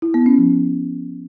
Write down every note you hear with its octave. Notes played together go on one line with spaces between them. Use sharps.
E4
B3
C#4
F3